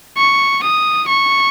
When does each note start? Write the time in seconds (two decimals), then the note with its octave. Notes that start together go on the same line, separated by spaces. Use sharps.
0.17 C#6
0.63 D#6
1.08 C#6